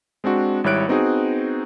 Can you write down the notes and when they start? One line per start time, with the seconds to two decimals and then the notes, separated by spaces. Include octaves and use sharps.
0.24 G#3 C4 D4 F#4
0.64 G#1 G3 E4 C#5 F#6 D7
0.88 B3 C4 D#4 F#4 G#4